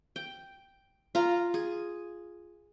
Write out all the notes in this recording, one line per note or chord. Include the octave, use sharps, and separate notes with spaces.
G5
F4 A#5
G#4